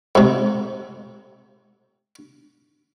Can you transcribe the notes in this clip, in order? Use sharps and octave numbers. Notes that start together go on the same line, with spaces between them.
G#2 C3